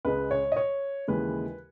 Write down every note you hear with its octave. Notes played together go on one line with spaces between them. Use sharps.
C#2 C#3 G#3 B4
C#5
D#5
C#5
D#2 C#3 E3 G#3 B4